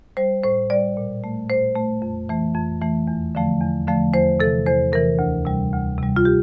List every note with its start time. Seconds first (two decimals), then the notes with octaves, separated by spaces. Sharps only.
0.17 G3 C5
0.44 A2 C5
0.70 G3 D5
0.97 A#2
1.24 A3
1.50 A#2 C5
1.75 A3
2.02 F2
2.29 E3 A3
2.55 F2
2.82 E3 A3
3.07 E2
3.35 D3 F3 A3
3.61 E2
3.87 D3 F3 A3
4.13 E2 C5
4.40 C3 E3 A4
4.66 E2 C5
4.92 C3 E3 A#4
5.19 D2
5.45 C3 G3
5.73 D2
5.98 C3 G3
6.16 F4
6.25 G4